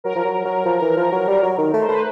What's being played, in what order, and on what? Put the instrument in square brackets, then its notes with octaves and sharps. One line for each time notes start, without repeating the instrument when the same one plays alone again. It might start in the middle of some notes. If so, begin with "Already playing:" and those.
[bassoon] F#3 [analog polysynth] A#4
[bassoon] F3
F#3
F#3
F3
E3
F3
F#3
[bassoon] G3 [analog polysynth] A#4
[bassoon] F#3
D#3
A3
[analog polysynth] C5
[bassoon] A3 [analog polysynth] B4